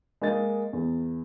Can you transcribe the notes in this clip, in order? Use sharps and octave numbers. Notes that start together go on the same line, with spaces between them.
G#3 A#3 D#5 A6
E2